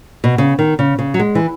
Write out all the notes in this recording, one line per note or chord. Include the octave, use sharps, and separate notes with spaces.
B2
C#3
D#3
C#3
C#3
F#3
G#3
E3